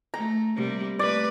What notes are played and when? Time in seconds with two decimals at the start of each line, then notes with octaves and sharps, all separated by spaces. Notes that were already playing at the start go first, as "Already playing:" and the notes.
0.14 A3 A#5
0.55 C3 G3 A#3
0.99 A3 B4 D5